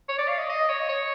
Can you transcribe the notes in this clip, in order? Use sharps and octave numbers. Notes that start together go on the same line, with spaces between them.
C#5
D5
F5
D#5
D#5
C#5
C#5